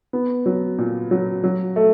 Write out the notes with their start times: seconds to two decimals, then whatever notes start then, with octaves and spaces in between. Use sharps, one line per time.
0.13 B3
0.46 F#3
0.78 A#2
1.11 F#3
1.44 F#3
1.76 A3